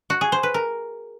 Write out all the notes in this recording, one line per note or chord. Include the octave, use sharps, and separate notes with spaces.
F#4
G#4
C5
B4
A#4